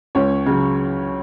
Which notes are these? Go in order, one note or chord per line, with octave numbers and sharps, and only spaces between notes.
C#2 C#4 C#5
C#3 F#3